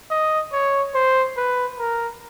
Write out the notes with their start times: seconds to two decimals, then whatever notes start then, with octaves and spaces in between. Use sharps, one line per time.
0.11 D#5
0.53 C#5
0.95 C5
1.37 B4
1.79 A#4